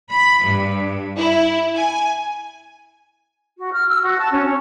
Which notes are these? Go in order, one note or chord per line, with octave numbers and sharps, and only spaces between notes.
B5
G2
E4
G#5
F#4
F6
E6
F#4
A5
C#4
C#4